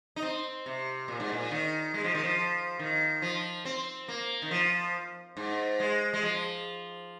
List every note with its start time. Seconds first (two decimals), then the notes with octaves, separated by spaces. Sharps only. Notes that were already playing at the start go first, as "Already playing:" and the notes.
0.16 D#4
0.22 C4
0.66 C3
1.08 A#2
1.20 G#2
1.32 A#2
1.51 D#3
1.94 G#3
2.04 F3
2.14 D#3
2.24 F3
2.79 D#3
3.22 F3
3.65 C4
4.08 A#3
4.42 D#3
4.51 F3
5.37 G#2
5.80 G#3
6.13 G#3
6.23 F3